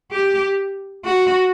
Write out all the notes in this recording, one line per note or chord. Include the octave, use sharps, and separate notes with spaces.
G4
F#4